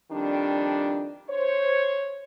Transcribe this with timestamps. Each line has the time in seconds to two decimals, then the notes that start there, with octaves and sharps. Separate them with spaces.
0.11 F2 D#3 G3 D4
1.29 C5 C#5